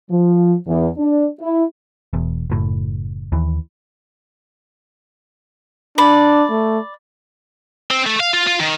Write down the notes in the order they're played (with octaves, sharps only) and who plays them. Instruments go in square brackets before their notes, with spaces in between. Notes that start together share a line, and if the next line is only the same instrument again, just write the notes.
[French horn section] F3
E2
D4
E4
[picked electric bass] E1 E2
F#1 A2
D#2 E3
[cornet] D4 [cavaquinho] D5 B5
[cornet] A3
[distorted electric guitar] C4
A3
F5
F4
F4
D#3